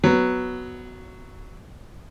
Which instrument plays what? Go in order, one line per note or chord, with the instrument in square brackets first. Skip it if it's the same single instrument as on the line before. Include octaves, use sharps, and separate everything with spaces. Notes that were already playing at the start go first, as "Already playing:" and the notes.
[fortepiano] F#3 B3